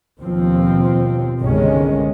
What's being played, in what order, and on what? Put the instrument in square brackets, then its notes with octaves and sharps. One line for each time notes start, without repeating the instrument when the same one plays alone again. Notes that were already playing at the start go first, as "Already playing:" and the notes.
[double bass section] D#2 B2 F3 C4
G1 C2 C3 D#3 G#3 C#4